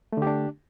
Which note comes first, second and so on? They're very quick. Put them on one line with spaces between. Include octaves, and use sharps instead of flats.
A3 D3 G4 D4